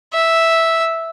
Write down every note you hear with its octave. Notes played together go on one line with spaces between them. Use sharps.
E5